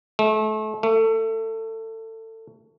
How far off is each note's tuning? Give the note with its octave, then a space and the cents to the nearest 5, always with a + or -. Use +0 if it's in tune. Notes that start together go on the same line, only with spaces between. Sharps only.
A3 -30
A3 +25